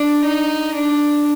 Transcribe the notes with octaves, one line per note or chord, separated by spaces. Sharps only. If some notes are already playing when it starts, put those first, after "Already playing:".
Already playing: D4
D#4
D4